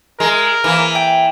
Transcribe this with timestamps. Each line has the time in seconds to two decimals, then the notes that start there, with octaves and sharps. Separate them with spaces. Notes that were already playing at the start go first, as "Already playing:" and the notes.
0.20 G#3 A#4
0.64 E3 A#3 B4 C5
0.95 G5